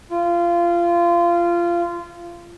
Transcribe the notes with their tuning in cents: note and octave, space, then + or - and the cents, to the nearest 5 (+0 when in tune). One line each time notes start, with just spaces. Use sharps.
F4 -20